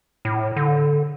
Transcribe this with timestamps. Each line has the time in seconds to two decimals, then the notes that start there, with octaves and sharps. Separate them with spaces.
0.25 A2
0.56 D3